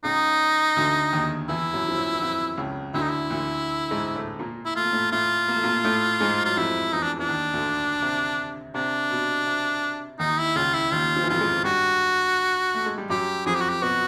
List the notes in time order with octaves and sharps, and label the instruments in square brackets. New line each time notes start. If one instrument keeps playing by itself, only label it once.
[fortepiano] C#2 C#3 [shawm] D#4
[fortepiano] D2 D3
D#2 D#3
[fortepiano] E2 E3 [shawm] E4
[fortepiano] F#2 F#3
F3
F#2 F#3
E3
F2 F3
C#2 C#3
[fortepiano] D2 D3 [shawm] E4
[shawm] D#4
E4
[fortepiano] D2 D3
G#2 G#3
A2 A3
A#2 A#3
[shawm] E4
[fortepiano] A3 [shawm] F4
[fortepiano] A#3
A2 A3
[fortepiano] A2 A3 [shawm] F4
[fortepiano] A#3
A3
A#2 A#3
A2 A3
G#2 G#3
[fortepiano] F#3 [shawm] F4
[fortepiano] F2 F3 [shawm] E4
[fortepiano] E2 E3 [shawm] D#4
[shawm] D4
[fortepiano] E3 [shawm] D4
[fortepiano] D#2 D#3
D2 D3
C3
[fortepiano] C3 [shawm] D4
[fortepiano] B2
C3
[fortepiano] D#2 D#3 [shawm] D#4
[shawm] E4
[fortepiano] C#2 C#3 [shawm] F4
[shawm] E4
[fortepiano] D#2 D#3 [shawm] F4
[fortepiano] F3
E3
[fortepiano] F2 F3 [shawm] F4
[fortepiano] G#2 G#3
[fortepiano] G2 G3 [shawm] F#4
[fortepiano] A3
G#3
G3
[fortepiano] F#2 F#3 [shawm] G4
[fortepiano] F2 F3 [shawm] G#4
[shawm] G4
F#4
G4
[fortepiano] B2 B3 [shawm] F#4